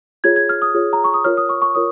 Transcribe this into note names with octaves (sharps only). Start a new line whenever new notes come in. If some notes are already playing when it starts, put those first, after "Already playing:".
F4 G#4 C#5 G#6
G#6
F6
D#6
F4 G#4 C#5
A#5
C#6
D#6
F4 A#4 C#5 F6
D#6
C#6
C#6
F4 A#4 C#5 D#6